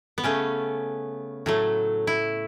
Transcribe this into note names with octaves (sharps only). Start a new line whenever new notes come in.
B3
C#3 A3 C#4
A2 F#3 A3
E4